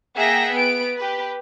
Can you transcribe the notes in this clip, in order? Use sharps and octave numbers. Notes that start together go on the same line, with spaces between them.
A#3 G#4 E5 F#5 G5 A#6
B3 D7
G4 B4